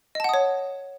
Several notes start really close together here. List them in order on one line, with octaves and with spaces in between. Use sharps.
D#5 A5 F#5 D#6 C#5